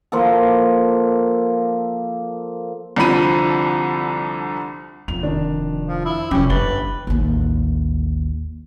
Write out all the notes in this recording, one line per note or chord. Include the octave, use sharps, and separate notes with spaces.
F3 A#3 A4
C2 D3 F3 B5 D#7
F1 F2 F7
D#3 D4 D#4
F3
E4
F1 F3 C#4 G4
G1 D3 B4 A6 G7
A1 D#2